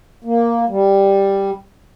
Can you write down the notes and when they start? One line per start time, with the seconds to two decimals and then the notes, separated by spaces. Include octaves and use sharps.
0.24 A#3
0.69 G3